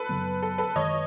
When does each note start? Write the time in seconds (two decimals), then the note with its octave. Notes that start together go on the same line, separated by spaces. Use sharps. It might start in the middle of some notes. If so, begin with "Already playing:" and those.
Already playing: A4 B4
0.09 F#2 C#3 F#3 B3
0.43 A4
0.58 A4 B4
0.75 F#2 D#3 G#3 C#5 D#5